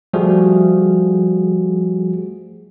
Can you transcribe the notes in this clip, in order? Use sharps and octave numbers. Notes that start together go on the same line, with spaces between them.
F3 G3 A3 F#4 G#4